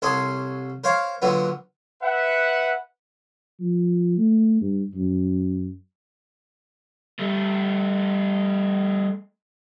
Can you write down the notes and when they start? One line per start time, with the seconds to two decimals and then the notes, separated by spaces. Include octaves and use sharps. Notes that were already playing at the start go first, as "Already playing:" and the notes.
0.02 C2 A4 C#5 C6 D#6
0.84 A#4 C5 C#5 F5
1.22 A#2 D3 F#3 B3
2.02 B4 E5 F#5
3.60 F3
4.18 A3
4.61 G2
4.95 F#2
7.19 G3 A3